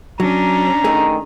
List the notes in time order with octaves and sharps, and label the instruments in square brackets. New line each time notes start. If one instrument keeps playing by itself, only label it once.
[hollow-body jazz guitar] F#3 [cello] C#4 D4 [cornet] A#5
[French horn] D#3 [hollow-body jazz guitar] A3 G#4